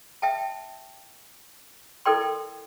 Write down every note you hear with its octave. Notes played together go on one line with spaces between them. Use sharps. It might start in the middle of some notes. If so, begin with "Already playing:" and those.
E5 G5 A5
E4 A4 A#4 D5 G5 C6